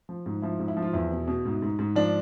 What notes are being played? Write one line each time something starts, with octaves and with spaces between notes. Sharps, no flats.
F3
G#2
F3 E4
G#2
E4
F3
F4
E2 E4
B2
B2
G#2
G#2
G#2
F3 D4